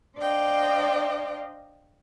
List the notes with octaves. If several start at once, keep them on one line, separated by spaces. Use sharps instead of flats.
D4 C5 D5 D#5 F5 G5